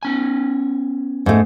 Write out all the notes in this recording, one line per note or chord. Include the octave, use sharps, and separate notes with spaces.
B3 C#4 G#5
G#2 A3